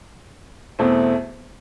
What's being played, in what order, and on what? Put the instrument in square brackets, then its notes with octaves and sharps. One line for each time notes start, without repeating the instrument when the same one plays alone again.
[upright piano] E2 B2 A3 C4 E4